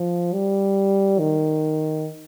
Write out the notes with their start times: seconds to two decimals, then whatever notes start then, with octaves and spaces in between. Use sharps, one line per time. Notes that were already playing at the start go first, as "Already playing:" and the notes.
Already playing: F3
0.33 G3
1.19 D#3